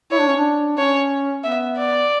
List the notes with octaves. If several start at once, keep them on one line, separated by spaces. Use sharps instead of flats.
E4 C#5
D4
C#4
D4
C#4 C#5
B3 E5
D5